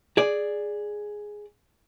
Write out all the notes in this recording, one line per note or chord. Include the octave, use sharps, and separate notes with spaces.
G#4 D5